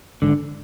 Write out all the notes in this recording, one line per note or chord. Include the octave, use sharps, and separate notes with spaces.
G#1 G#2 D3